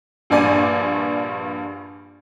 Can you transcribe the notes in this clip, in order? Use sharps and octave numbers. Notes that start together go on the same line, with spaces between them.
A#1 G2 D5 G#5